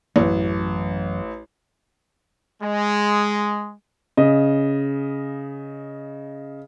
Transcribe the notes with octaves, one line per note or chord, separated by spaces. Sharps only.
A1 F#2 E3
G#3
C#3 D#5